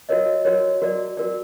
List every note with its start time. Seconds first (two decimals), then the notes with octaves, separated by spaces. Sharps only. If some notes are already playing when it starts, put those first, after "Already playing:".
0.09 F#4 A#4 C#5 D#5
0.45 F#4 A#4 C#5
0.82 F#4 A#4 D5
1.17 F#4 A#4 D5